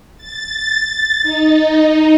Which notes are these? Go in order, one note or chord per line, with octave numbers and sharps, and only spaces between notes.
A6
D#4